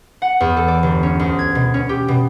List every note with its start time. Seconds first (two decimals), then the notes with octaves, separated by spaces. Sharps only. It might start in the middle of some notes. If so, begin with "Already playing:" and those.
0.22 F#5
0.40 E2
0.57 A4
0.68 D5
0.83 G1
1.03 C#4
1.19 D2
1.39 G#6
1.55 B2
1.74 C#4
1.89 G4
2.08 B2